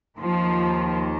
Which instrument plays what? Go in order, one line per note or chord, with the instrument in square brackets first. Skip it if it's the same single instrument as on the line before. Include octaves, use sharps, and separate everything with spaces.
[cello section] D#2 D#3 F3